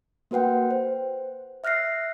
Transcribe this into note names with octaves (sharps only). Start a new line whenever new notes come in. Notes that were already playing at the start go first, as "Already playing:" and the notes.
A#3 F#4 B4 F#5 G5
C5
E5 F6 F#6 A#6 C7